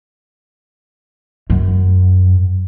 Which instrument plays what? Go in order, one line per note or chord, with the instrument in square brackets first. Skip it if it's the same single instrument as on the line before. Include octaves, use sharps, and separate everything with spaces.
[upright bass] F#2